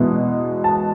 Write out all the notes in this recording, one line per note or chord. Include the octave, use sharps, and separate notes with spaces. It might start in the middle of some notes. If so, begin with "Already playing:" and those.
Already playing: E2 B2 G#3 B3 E4
A5